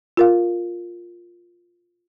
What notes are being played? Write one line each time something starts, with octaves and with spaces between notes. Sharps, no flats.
F4 A#4 F5